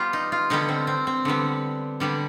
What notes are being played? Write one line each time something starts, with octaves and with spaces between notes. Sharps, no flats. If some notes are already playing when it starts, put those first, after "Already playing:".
Already playing: G3 B3 F4 G4
D#4
F4
D3 G3 B3 D#4
C4
C4
C4
D3 G3 B3
D3 G3 B3